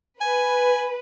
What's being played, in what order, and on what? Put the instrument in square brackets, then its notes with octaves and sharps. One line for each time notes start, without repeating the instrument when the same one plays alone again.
[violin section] B4 [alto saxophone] G#5